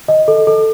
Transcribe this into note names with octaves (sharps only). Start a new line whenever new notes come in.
D#5
A4
A4